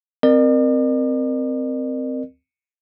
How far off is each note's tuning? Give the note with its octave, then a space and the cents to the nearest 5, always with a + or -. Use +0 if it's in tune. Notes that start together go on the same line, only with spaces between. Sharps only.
C4 -10 A#4 +0 D5 +45